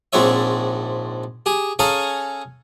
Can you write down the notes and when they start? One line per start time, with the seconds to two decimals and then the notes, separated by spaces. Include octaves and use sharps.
0.13 A#1 G#2 C4 D4 C#5 E5
1.46 G4 G#4
1.79 C#4 G#4 A4 F5 G#5 A#5